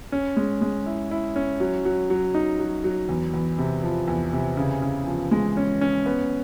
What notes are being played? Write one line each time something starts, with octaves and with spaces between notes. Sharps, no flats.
C#4
G#3
G#3
E4
E4
C#4
F#3
F#3
F#3
D#4
F#3
F#3
E2
E2
C3
F3
E2
C3
C#3
C#3
F3
G#3
C#4
C#4
B3